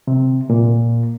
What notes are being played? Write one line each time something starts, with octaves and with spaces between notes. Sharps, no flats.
C3
A#2